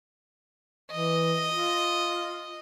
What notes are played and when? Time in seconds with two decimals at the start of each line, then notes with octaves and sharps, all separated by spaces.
0.92 E3 D#5
1.50 F4